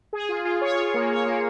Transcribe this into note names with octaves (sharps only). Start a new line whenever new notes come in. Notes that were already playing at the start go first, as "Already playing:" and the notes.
G#4
F4
F4
C#5
F4
A#3
C#5
A#3